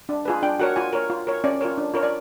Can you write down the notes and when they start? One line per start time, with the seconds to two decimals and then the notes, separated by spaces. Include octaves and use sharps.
0.09 D4
0.25 F4 G#4 B4
0.42 D4 G5
0.59 F#4 A#4 C#5 F#5
0.76 F4 G#5
0.93 A#4 C#5
1.10 F4
1.27 A#4 C#5
1.44 C#4 D5
1.61 F4 A#4 C#5
1.78 D4
1.94 F4 A#4 C#5
2.03 D5